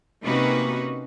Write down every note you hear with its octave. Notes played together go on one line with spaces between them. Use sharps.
C3 A#3 C#4 D#4 F#4 B4